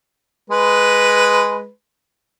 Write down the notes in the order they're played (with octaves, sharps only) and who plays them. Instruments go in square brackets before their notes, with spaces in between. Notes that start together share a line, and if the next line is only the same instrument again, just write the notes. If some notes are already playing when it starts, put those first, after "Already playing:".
[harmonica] G#3 B4